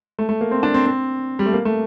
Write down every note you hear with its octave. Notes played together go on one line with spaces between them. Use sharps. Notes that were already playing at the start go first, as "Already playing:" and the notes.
A3
A3
A#3
C4
D4
C4
C4
G3
A3
A#3
A3